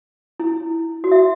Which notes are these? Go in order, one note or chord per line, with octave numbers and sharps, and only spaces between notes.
E4
F#4
E5